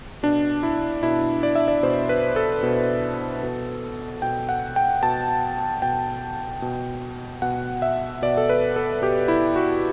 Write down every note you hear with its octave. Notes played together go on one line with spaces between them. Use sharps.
B2 D4
E4
B2 E4
D5
E5
D5
B2 C5
B4
A4
B2
B2
B2 G5
F#5
G5
B2 A5
B2 G5
B2
B2 F#5
E5
B2 D5
A4
B4
A4
B2 G4
E4
F#4